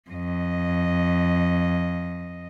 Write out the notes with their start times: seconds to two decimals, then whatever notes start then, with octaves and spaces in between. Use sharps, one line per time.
0.10 F2 D#5